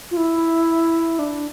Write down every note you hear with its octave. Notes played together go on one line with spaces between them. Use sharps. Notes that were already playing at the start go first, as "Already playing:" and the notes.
F4
E4
D4